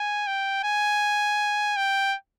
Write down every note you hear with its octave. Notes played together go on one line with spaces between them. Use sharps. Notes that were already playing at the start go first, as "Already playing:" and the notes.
Already playing: G#5
G5
G#5
G5